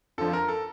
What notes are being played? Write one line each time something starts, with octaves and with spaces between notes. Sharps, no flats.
F2 D3 F3 A4
A#4
A4